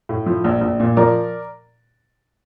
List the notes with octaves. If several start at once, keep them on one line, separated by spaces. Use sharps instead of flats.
A2
F3
A#1
A#1
A#2
F3 A#4 D5